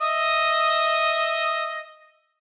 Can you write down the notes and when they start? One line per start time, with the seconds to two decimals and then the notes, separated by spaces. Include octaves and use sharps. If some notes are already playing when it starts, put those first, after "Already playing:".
0.01 D#5 E5 D#6